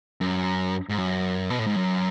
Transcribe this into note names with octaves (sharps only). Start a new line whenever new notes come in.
F#2
G#2
F#2
B2
A2
G#2
F#2